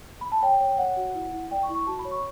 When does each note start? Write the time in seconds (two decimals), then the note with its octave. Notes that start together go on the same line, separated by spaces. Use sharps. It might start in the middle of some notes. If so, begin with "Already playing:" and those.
0.21 B5
0.32 A5
0.42 C#5 G5
0.60 C#5
0.78 C#5 F#5
0.97 F#4
1.14 E4
1.33 E4
1.51 D5 G5
1.63 C#6
1.69 E4
1.75 C#6
1.87 F#4 A5
1.99 B5
2.05 C#5
2.11 C#6